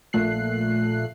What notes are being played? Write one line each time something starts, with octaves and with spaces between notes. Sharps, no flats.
A#1 A#2 A3 F#6 C7